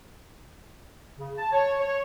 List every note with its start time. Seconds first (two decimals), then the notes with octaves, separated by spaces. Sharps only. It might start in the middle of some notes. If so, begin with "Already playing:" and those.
1.19 C#3
1.38 A5
1.52 C#5
1.79 C#5